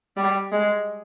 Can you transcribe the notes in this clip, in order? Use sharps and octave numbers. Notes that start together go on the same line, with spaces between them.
G3
G#3